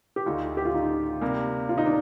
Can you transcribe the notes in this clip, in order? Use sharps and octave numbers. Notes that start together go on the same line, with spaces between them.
G4
D2 D3 A3 D#4 F4
G4
F4
D#4
C3 G3 A#3
F4
D#4
D4